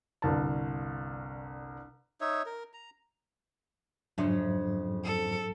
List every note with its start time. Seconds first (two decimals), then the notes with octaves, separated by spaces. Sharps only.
0.22 G1 C2 A5
2.21 D#4 C#5 E5
2.46 A#4
2.73 A#5
4.18 F2 G#2 C#3 F#3 D4 E5 C6
5.04 A4